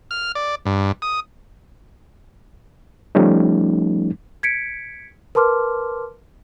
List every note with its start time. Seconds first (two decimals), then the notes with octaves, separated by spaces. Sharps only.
0.11 F6
0.35 D5
0.66 G2
1.02 D#6
3.15 F3 G3 A3 C#4 D#4
4.43 G#6 B6 C#7 D7
5.35 A#4 B4 A5 C6 D6 F6